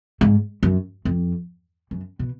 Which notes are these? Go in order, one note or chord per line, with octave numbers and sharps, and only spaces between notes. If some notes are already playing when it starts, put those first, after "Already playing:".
G#2
F#2
F2
F#2
B2